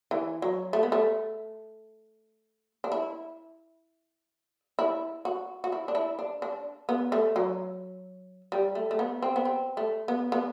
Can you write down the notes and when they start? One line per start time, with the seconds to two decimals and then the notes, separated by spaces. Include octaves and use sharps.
0.11 E3
0.42 F#3
0.73 A3
0.83 B3
0.92 A3
2.84 D4
2.92 E4
4.79 E4
5.25 F#4
5.64 F#4
5.72 E4
5.88 D4
5.95 E4
6.19 D4
6.42 D4
6.89 B3
7.12 A3
7.36 F#3
8.52 G3
8.75 A3
8.91 A3
8.99 B3
9.23 C4
9.36 B3
9.45 C4
9.77 A3
10.08 B3
10.32 B3